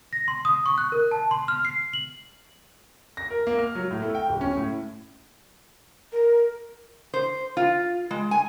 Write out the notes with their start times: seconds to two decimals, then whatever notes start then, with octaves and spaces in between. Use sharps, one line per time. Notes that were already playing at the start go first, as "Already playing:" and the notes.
0.13 A#6
0.28 C6
0.45 D#6
0.66 C#6
0.78 F#6
0.92 A#4
1.11 A5
1.31 C6
1.48 F6
1.65 C7
1.93 F#7
3.17 A#6
3.30 A#4
3.47 A#3
3.58 F6
3.75 F#3
3.91 A2
4.02 A3
4.15 G5
4.29 D1
4.41 C#4
4.57 A2
6.12 A#4
7.14 C5
7.57 F4
8.11 G#3
8.31 G#5